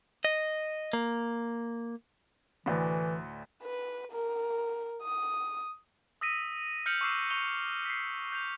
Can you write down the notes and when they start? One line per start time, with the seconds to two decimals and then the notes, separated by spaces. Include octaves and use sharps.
0.25 D#5
0.93 A#3
2.66 D2 A2 E3
3.63 B4
4.12 A#4
5.03 D#6
6.21 D#6 E6 A#6 B6 D#7
6.86 F6 G6 C#7 F7 F#7
7.01 C#6 D6 E6 C7 E7
7.30 C#6 G6 F7 G7
7.86 B6 C7
8.32 G6 C7 F7